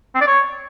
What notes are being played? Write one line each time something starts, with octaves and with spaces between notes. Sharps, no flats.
C4
D5
C#5